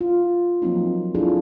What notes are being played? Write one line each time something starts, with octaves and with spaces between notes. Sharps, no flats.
F4
F3 F#3 A#3 C4 D#4
D4 E4 F4 G#4 A4